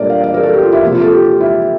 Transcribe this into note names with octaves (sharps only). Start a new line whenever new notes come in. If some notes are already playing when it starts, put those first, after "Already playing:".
Already playing: A#2 G3 D4 A4 A#4 D5
F5
D5
A#4
A4
G4
F4
E4
C3 F3 A#3
F4
A4
G4
F4
E4